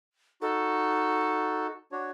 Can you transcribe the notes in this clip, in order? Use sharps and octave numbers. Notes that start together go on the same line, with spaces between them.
D#4 F#4 A4
D4 F#4 C#5